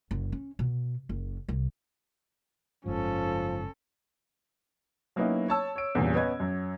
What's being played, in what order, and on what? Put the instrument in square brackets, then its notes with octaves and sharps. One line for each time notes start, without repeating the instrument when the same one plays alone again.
[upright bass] F#1
C#4
B2
F#1
C2
[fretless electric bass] F#1 G#2 [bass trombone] F3 [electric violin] C#4 A4
[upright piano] F#3 A#3 B3 C#4 D#4 E4
C#5 A5 E6
C#5 D7
E2 G2 A#2 C#3
B3 C#4 D#5 G#6
F#2